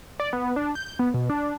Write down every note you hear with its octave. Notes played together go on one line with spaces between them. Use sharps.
D5
B3
D4
G6
B3
B2
D4